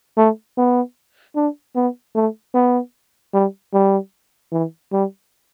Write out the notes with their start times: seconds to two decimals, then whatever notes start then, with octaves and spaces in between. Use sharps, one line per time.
0.17 A3
0.57 B3
1.36 D4
1.76 B3
2.15 A3
2.55 B3
3.34 G3
3.73 G3
4.52 E3
4.92 G3